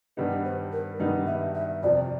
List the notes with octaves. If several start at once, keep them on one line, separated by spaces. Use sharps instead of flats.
G2 D#3 G3 B3 D#4 B4
C5
A#4
G2 D#3 G3 B3 D#4 B4
E5
E5
F2 C3 F3 D5